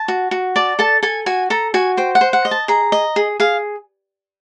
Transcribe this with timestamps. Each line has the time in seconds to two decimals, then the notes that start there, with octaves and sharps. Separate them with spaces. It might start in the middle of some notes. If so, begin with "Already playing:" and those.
Already playing: A5
0.08 F#4
0.31 F#4
0.56 D5 A5
0.79 A4 A5
1.03 A4 G#5
1.26 F#4 G#5
1.50 A4 A#5
1.74 F#4 G#5
1.97 C5 G5
2.15 F#5
2.21 C5
2.33 F#5
2.45 D#5
2.51 A5
2.68 G#4 A#5
2.92 D#5
3.16 G#4
3.40 G#4 F5